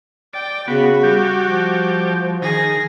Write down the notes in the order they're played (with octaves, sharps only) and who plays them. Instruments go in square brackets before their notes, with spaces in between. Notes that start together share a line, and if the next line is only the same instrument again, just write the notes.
[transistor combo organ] D5 [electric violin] G5
[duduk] C#3 [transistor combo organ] B3 [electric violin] F#4
[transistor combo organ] G3 G4
[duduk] F3
[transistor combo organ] D#3 [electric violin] G#4 A#6